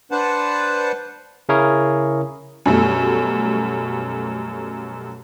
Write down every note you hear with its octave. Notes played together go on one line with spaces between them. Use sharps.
D4 B4 C5 F#5 A5
C#3 C#4 E4 G#4 A#4 C#5
F#2 B2 G3 A3